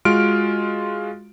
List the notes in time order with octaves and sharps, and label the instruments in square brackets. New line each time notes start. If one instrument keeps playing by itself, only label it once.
[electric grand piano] G#3 F4 F#4 F6 D7